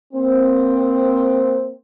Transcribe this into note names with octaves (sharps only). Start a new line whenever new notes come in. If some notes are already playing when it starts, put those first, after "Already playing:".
A#3 C4